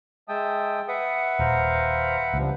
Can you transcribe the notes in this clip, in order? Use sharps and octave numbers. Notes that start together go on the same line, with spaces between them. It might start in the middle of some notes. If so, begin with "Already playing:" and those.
G#3 E5 G5 A5 D#6
B4 E5 F#5 D#6
D#1 C5 F5 A#5
C#2 G2 C3 F3